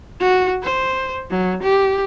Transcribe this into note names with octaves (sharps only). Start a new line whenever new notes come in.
F#4
C5
F#3
G4